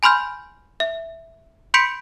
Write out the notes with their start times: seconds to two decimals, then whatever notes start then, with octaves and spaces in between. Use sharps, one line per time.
0.03 G#5 B5 C6 F6 G6
0.80 E5
1.74 B5 C6 G6 B6 C#7 D7